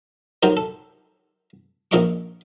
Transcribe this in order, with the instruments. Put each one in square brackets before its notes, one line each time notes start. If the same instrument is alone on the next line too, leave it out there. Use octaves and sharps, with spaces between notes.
[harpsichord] F#3 D#4 G4 A#4 C5
A4
A#1 F3 A#4 D#5 C#6 D6